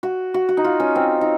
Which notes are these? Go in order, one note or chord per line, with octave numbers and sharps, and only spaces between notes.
F#4
F#4
F#4
D#4
F4
C#4
C4
D#4